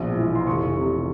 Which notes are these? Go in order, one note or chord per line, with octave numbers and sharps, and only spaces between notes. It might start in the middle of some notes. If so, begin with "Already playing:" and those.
Already playing: A#1 B2
E3
C6
F1 C#6
C3